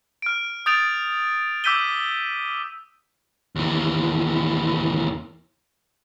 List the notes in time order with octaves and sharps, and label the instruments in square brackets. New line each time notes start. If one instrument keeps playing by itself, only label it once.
[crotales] F6 D7
D#6 G6 A6 D7 F7
D6 E6 G6 B6 D#7 G7
[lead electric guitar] D#2 E3